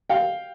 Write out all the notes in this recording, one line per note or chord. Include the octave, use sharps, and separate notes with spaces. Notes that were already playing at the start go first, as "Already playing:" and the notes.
F5 G5